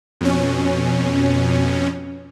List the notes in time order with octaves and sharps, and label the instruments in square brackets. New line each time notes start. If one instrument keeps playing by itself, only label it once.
[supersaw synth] F2 B2 C#4